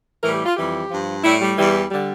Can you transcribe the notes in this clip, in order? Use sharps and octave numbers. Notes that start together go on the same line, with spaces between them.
A2 E3 G3 A#4
G4
F4
F2 E3 G3 G4
G2 F3
A2 G3 E4
G3
E2 E3 G3
D3 G3